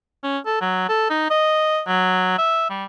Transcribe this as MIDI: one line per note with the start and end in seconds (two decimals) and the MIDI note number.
0.23 0.38 61
0.46 0.57 69
0.61 0.86 54
0.89 1.06 69
1.10 1.29 63
1.30 1.81 75
1.87 2.35 54
2.38 2.68 76
2.70 2.85 55